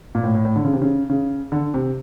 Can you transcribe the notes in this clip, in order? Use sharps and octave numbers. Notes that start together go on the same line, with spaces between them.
A#2
A2
A2
A2
D3
C#3
C3
C#3
C#3
D3
C3